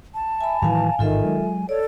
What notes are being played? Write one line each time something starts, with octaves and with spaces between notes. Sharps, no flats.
A5
E5 G#5 B5
A2 D#3 E3 F#3 F5 G#5
A1 G#2 D#3 F4 A4 E5 G#5
F#3 G#3
A4 C#5 D5